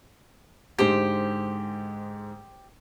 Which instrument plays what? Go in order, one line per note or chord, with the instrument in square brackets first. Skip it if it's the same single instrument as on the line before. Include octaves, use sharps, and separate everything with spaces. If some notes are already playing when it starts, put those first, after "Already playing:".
[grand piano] G#2 D3 G#3 [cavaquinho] G4 C5